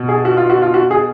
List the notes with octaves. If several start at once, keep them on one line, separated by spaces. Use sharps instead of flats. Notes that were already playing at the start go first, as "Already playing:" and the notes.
Already playing: B2
G#4
F#4
F4
F#4
F4
F#4
G#4